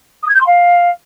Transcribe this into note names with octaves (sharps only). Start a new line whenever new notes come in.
D#6
G#6
G6
C6
F5